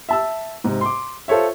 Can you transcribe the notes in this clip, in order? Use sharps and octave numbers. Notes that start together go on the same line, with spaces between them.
E5 A5 E6
G#2 C3
C6 D6
F4 A4 C5 C#5 E5